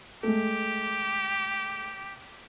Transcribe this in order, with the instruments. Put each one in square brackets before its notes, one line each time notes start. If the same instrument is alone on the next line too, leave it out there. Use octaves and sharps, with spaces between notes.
[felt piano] G#3 A3 [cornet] G4